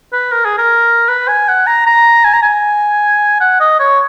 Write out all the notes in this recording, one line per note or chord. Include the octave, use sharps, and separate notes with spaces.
B4
A#4
G#4
A#4
B4
G#5
F#5
A#5
A#5
G#5
A#5
G#5
F#5
D#5
C#5